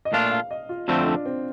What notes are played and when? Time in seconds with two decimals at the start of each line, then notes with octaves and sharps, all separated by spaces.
0.05 D#5
0.13 A#2 A3 D4 F4 F5
0.32 F5
0.51 D#5
0.69 F4
0.88 F2 D3 A3 C4 F4
1.07 D4
1.25 C4